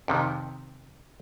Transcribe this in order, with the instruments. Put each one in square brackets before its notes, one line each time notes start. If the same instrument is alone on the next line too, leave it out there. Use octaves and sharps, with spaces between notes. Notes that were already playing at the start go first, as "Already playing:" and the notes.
[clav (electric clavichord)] F2 C3 D#3